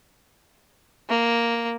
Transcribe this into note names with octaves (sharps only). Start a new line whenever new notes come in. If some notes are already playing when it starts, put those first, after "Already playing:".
A#3